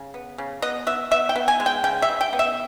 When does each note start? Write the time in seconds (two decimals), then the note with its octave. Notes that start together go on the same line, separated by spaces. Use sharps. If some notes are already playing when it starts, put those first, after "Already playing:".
Already playing: C#3
0.14 B3
0.38 C#3
0.62 B3 D#5
0.87 B3 E5
1.11 B3 E5
1.29 G5
1.36 B3
1.48 G#5
1.60 G#3
1.66 G5
1.84 C#3 G5
2.02 E5
2.09 C#3
2.21 G5
2.33 B3
2.39 E5